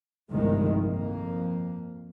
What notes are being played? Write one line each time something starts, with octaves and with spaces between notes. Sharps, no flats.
G1 C2 A2 D#3 F3 G#3
F2 A#3